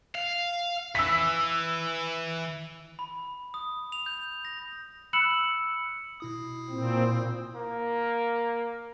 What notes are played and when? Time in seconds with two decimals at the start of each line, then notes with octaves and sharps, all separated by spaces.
0.15 F5
0.95 E3 E6 B6
2.99 B5
3.54 D#6
3.92 F7
4.06 G6
4.45 A#6
5.13 B5 E6 F#6 C#7 E7 F#7
6.20 B2 E4 D#6
6.70 A#2 C4
7.55 A#3